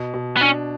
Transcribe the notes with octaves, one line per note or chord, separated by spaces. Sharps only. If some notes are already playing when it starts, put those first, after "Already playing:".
Already playing: B2
B2
B3
C#4 D4